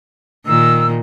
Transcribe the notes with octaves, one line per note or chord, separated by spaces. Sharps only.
A#2 D#3 E6